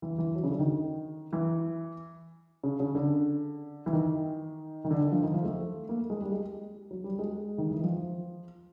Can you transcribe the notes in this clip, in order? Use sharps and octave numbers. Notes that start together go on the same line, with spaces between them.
E3
E3
F#3
C#3
D3
D#3
E3
C#3
C#3
D3
E3
D#3
D#3
D3
D3
F3
D#3
F3
A3
A#3
G#3
G3
G#3
F#3
G3
G#3
D#3
E3
F3